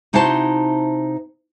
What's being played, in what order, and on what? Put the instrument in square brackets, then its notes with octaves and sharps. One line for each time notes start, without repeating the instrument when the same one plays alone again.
[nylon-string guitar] C3 D#4 E4 F#4 C5 A5